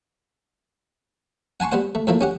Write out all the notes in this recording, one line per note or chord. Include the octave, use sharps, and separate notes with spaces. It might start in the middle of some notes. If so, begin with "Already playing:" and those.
F#5 G#5 A5 C6 C#6
G3 B3 C5 F#5
A3
A2 F3 A3 A#3
C#4 G4 F#5